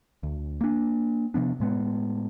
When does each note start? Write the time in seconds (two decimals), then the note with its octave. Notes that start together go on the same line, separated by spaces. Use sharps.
0.23 D2
0.61 A#3 D4
1.34 C3 F3 B3 D4
1.60 A2 G#3 B3